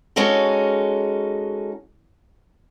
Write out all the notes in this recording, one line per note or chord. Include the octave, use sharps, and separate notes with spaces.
G#3 C#4 D#4 F#4 A4